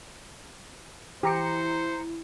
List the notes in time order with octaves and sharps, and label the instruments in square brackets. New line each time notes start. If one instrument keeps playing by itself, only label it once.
[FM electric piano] E3 A#5 C#7 [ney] E4 [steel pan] G4 [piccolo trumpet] C5